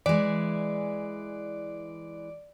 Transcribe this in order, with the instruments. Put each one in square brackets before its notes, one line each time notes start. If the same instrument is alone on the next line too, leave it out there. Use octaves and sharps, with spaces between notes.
[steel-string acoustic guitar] E3 G#3 [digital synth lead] D5